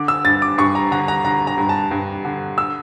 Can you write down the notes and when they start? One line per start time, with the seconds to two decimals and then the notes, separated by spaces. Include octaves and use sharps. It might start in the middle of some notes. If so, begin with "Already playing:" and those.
Already playing: D3 D6
0.08 E6
0.25 G2 A6
0.42 D6
0.58 G2 C#6
0.75 A#5
0.92 D3 A#5
1.08 A#5
1.25 D3 A#5
1.47 A#5
1.58 G2
1.69 A5
1.91 G2
2.25 D3
2.58 E6